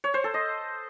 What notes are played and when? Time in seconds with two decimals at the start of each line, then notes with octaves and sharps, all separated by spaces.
0.04 C#5
0.14 C5
0.24 A4
0.34 D#5